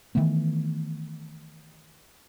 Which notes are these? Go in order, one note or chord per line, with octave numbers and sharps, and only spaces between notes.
D#3 E3 A3 B3